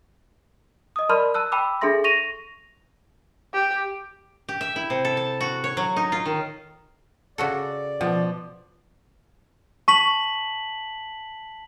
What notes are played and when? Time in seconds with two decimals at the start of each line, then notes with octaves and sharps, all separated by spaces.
0.96 D#5 D#6
1.09 A#4 D5 A5 B5 C6 F6
1.34 A5 E6 F#6
1.52 G5 A5 B5 D6 E6
1.81 D4 G#4 A4 E5 C6 A#6
2.04 C#6 A#6 D#7 F7
3.54 G4
4.49 G4
4.61 E5
4.76 E4
4.90 C3
5.05 A4
5.17 A5
5.41 F#4
5.64 C#5
5.77 F#3
5.96 D#4
6.12 F4
6.26 D#3
7.38 C#3 F#4 A4 D5
8.01 B2 F3
9.88 A5 C#6 B6 F#7